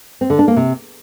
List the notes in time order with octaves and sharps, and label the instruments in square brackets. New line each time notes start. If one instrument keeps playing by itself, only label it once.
[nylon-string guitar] C4
D3
D4
A#3
C3